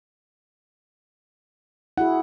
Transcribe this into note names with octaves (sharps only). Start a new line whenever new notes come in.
E4 F#4 G#4 F#5